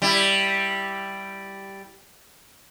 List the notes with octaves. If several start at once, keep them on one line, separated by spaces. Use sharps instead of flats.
G3 E4